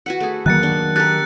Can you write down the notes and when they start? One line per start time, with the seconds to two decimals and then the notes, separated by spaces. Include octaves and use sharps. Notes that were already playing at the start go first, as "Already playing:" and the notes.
0.06 F#4 B4 F#5
0.20 A3 G#4
0.46 D#3 F#3 A#3 F#6 A6 C#7
0.63 D4
0.96 G4 A4 A#4 F#6 A6